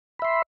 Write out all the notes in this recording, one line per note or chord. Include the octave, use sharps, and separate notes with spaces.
E5 B5 C6